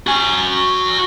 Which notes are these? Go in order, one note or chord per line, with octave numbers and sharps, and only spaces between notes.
F#4 G#5